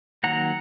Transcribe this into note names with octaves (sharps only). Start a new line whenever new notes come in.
D#3 F#3 A#3 F#5 A#5